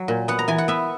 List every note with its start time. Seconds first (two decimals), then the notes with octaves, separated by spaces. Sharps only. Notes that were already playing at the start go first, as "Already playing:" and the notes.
Already playing: F#3
0.08 A#2
0.28 B3 F#5
0.39 A#5
0.48 E3 G#5
0.58 F#5
0.68 B3 E5